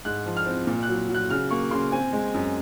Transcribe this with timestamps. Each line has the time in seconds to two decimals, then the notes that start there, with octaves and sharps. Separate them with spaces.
0.05 G#2 F#6
0.26 F3
0.37 F6
0.46 C4
0.67 A#2
0.83 F#6
0.89 F#3
1.09 F#3
1.14 F#6
1.30 C#3 F6
1.51 A#3 C#6
1.71 C#3 C6
1.92 C4 G#5
2.13 G#3
2.34 F#2